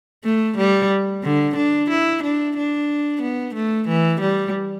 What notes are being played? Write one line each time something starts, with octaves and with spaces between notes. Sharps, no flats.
A3
G3
D3
D4
E4
D4
D4
B3
A3
E3
G3